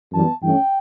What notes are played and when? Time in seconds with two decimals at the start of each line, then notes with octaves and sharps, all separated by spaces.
0.13 F#2 E3 G3 B3 A5
0.42 G2 E3 A3 C#4 G5